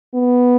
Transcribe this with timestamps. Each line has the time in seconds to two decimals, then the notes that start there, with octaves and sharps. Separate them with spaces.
0.15 B3